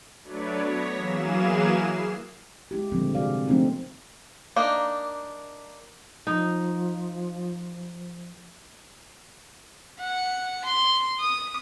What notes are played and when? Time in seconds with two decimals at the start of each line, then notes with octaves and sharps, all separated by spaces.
0.23 F#3 A3 D4 B4 C#5 D5
0.57 B3 C#5 A#6 B6
0.95 E3 F#3 A#3 G#4 F5 E7
1.72 C7
2.71 G#3 E4 G4
2.92 A#2 D3 F3 G3 G#3 C4
3.15 C3 F#4 G#4 D5 F5
3.47 F3 A3 A#3 C4 D4 D#4
4.56 A#3 D4 D#4
6.27 F3 D#4
9.99 F#5
10.65 C6
11.20 D#6